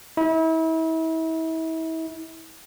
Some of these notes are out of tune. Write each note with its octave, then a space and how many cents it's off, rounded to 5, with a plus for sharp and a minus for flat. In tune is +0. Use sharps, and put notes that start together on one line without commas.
E4 -35